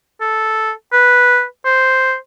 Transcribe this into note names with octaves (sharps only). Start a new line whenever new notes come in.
A4
B4
C5